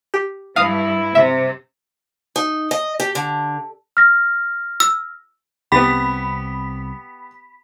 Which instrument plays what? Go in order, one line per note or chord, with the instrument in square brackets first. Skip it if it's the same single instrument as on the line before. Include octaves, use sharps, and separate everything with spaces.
[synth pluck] G4
[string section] G2 [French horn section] E4 B4 [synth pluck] F5 D#6
[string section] C3 [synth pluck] E5
[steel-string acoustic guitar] D#4
D#5
G4
D3
[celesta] F6 A#6
[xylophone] E6
[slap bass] C2 C4 [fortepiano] B3 G4 [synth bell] B5 B6